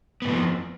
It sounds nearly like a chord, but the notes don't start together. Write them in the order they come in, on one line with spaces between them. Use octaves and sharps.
B3 G#2 F3 F2